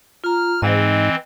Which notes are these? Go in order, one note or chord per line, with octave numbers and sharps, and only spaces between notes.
F4 A#5 F6
G#2 E3 C4 D#5